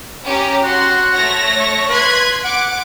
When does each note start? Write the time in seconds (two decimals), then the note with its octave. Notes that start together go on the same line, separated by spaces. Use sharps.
0.26 C#4 G4 A#5
0.63 F#4 F#5 C6
1.13 A3 C#5 A#6
1.60 C#6
1.90 B4 C6 F#6 G#6
2.44 F#5 D6 D7